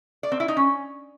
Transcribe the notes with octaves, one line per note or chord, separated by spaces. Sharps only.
D5
C4
E4
D#4
C#4